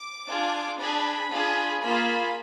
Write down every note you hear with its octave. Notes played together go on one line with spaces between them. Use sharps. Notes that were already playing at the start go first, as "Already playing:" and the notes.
Already playing: D6
D4 F4 G#4
D4 G#4 B5
D4 F4 G#4
A#3 F4 G#4 B5